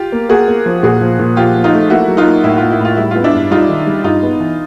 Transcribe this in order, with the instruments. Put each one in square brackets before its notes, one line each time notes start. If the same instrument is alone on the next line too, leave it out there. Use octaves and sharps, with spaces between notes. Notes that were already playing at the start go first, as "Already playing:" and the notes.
Already playing: [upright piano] F4 G4
[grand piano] A#3
[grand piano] A#3 [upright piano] F#4 G#4
[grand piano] A#3
F3
[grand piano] A#2 [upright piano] F#4 G#4
[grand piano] F3
A#2
[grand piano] F3 [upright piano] F4 G4
[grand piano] F3
[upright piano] D#4 F4
[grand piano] A3
[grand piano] A#3 [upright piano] E4 F#4
[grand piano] F#3
[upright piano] D#4 F4
[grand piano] A#3
[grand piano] A2 [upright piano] E4
[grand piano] A#3 [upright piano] F4
[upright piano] E4
[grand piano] A2 [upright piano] F4
[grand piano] G3 [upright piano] E4
[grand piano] B3 [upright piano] F4
[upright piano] D4 E4
[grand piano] G2
[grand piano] G3 [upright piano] D#4 F4
[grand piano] D#3
G3
[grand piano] G2 [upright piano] D#4 F4
[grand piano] B3
E3